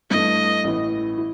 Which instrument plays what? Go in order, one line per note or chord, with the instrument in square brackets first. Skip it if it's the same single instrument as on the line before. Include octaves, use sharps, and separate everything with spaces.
[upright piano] G2 E3 A3 [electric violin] D#5
[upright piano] A1 A2 E3
E4